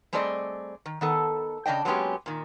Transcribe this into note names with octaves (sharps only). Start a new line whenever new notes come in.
G3 A3 C4 G#4 D5 D#5
D#3
D#3 B3 A4
C#3 C4 D4 D#5 G5
F#3 G#3 A#3 B3 C#4 G4
A#2 D#3